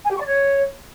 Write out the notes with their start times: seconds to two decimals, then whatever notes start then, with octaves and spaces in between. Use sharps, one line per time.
0.05 G#5
0.10 G4
0.15 C#6
0.20 D5
0.25 C#5